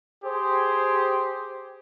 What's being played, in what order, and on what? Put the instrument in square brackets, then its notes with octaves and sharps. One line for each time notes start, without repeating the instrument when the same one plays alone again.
[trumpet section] G4 G#4 C5